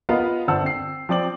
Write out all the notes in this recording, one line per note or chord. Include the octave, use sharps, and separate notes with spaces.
B3 F4 A#4 D#5 F5 B5
G1 D4 C5 F#5 A5 E6
C4 C7
F3 C4 D5 D6 F#7